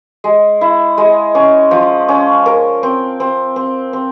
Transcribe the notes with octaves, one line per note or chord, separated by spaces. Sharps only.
G#3
E4
G#3
C#4
F3
C#4
A#4
C4
C4
C4
C4